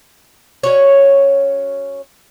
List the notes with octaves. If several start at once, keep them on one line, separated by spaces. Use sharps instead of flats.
C#4 F#4 C#5